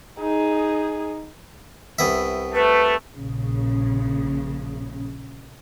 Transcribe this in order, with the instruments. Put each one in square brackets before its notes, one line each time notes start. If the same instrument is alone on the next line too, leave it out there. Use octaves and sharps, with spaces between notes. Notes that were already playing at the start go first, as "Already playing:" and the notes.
[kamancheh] D#4 G#4
[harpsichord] C2 B3 E5
[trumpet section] A3 [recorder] B4
[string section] A#1 C#3